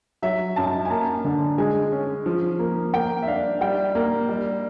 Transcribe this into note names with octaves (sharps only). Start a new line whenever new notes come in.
F#3 E5
F#2 A5
G#5
A#3 A5
D3
G#3 G#5
C#4
F3
A#3
A#3 G5
E5
D4 F5
G3 G5
A#3
G3